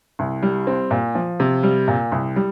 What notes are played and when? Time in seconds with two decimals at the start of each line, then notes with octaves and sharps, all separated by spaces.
0.19 C2
0.43 G3
0.67 C4
0.91 A#2
1.15 F3
1.40 C3
1.63 G3
1.88 A#2
2.12 C2
2.36 G3